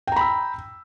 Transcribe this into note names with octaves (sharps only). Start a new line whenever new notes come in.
G5 A#5 B5 E6